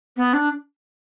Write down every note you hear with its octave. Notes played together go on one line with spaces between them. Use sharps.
B3
D4